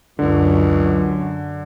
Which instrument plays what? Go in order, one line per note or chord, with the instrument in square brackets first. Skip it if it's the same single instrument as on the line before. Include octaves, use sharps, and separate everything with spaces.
[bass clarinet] C#2 [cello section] F#2 [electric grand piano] D3